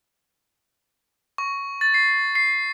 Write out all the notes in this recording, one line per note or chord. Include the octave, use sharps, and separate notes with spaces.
C#6
A6
C7
C7